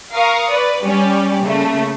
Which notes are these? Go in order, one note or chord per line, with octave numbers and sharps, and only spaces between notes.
A#4 F5 C#6 D#6
B4 D5
G3 C#4 G4 D5
C#3 A3 A#3